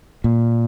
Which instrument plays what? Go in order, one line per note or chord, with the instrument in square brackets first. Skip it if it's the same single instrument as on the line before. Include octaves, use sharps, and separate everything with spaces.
[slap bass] A#2